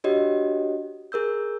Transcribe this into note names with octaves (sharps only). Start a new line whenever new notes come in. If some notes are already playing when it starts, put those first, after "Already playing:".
D4 F#4 G4 C#5 D#5
G#4 A#4 E6 G6